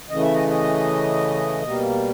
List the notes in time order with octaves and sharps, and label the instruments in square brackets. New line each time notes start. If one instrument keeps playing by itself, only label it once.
[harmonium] C#3 E3 A3 D#5
E5
D#5
D#5
B2 G3 A#3